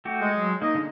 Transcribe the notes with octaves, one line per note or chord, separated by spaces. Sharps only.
A3 F#4 G4
G#3
F#3
A#3 D#4 D#5
D3 G#3 A#3